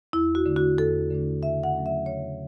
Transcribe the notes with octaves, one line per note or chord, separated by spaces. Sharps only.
E2 E4
F#4
D3 A3 D4
F#4
E2 A4
D3 A3 D4
C#3 E5
F#5
F#3 A3 C#4
E5
C#3 C#5